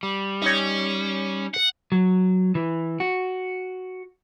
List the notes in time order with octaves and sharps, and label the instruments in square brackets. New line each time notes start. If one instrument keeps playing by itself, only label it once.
[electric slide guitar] G3
[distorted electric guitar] C#4 [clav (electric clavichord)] D#4 C#5
[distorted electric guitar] F#5
[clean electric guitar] F#3
E3
F#4